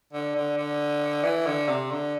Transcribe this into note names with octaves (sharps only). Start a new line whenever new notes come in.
D3
D3
D3
E3
D3
C3
D3